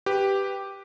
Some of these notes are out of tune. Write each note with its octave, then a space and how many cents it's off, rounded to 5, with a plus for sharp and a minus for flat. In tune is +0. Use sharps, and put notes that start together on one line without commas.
G4 +0 B4 +0